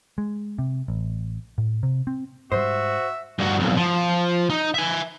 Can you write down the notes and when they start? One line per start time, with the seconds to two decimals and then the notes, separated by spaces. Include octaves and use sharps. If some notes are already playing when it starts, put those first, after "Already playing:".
0.18 G#3
0.58 C3
0.88 A1
1.58 A2
1.83 C3
2.07 C4
2.52 G#2 G3 F#4 C5 E5
3.40 G2 F#4
3.60 B1 F2
3.77 F3
4.50 D#4
4.74 E5 G#5